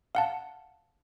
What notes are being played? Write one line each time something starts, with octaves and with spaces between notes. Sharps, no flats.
F5 F#5 A5